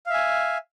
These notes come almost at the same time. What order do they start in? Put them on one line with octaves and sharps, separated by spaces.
F5 E5 G#5